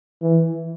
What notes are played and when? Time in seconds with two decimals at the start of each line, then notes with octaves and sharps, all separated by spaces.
0.22 E3